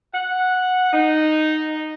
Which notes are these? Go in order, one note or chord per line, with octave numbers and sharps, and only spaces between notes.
F#5
D#4